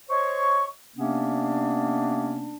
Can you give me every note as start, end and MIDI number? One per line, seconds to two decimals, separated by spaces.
0.09 0.64 72
0.09 0.64 73
0.09 0.64 75
0.09 0.64 85
0.96 2.57 48
0.96 2.57 58
0.96 2.57 59
0.96 2.57 61
0.96 2.57 62